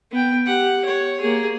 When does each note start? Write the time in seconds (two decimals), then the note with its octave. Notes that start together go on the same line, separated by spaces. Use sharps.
0.11 B3 G5
0.46 G4 F#5
0.85 C#5
1.21 A#3 G#4